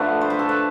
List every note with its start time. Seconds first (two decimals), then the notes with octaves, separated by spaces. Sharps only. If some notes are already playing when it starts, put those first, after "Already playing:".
Already playing: D3 F3 A3 B4
0.21 C5
0.30 B4
0.39 A4
0.49 B4